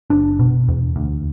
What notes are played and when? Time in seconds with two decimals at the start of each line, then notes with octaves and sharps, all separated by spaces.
0.10 F#1 D4
0.39 B2
0.68 E2
0.96 D2